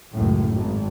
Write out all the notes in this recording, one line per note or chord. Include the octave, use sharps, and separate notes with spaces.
C#2 F#2 A2
G#1